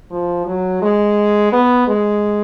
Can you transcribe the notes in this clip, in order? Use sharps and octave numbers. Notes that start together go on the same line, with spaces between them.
F3
F#3
G#3
B3
G#3